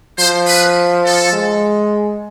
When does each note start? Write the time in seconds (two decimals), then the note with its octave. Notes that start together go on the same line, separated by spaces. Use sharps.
0.19 F3 C5
0.47 B4
1.05 A4
1.33 G#3